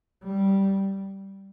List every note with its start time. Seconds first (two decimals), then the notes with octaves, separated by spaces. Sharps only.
0.23 G3